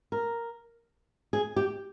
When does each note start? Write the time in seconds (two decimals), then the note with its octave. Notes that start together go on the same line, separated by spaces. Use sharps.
0.12 A#4
1.33 G#4
1.56 G4